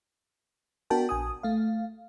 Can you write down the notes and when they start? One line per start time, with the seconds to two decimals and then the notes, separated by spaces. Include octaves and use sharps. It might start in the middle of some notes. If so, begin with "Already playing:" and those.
0.90 B3 D4 F#4 A#4 G5 A5
1.09 A#1 G#5 D#6
1.43 A3 F5